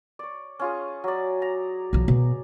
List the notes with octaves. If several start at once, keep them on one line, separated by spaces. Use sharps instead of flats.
C#5 D5
C#4 F4 G#4
F#3 D5
A#5
B1 F3
B2